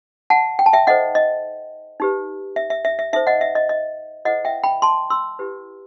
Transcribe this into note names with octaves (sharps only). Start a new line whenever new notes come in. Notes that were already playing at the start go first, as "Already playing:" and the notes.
F#5 A5
G5
A5
E5 G5
D#4 A4 C5 D#5 F#5
D#5
D#4 G4 B4
E5
E5
E5
E5
D#4 A4 C5 E5
D#5 F#5
E5
D#5
D#5
E4 A4 C5 D#5 F#5
E5 G5
G5 B5
A5 C6
C6 E6
E4 G4 B4